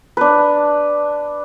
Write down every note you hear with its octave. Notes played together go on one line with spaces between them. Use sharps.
D4 B4